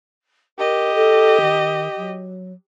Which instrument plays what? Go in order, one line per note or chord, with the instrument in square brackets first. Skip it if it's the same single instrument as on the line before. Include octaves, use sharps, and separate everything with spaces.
[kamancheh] G4 D#5 [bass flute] A#4
[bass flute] A4
D#3
F#3